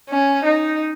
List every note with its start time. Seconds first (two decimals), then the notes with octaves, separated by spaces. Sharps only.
0.10 C#4
0.45 D#4